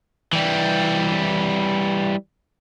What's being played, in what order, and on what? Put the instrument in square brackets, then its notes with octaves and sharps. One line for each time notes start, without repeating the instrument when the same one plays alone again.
[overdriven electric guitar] E3 G3